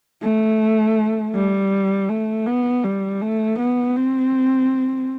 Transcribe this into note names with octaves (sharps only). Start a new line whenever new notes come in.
A3
G3
A3
B3
G3
A3
B3
C4